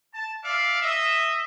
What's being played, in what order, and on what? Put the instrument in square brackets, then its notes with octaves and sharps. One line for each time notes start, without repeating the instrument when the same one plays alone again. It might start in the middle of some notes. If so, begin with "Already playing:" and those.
[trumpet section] A5
D5 E5 F5
D#5 E5